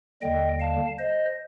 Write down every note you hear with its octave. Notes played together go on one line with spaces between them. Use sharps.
D#2 D3 G3 D#5 G5
F5 A5
C5 D#5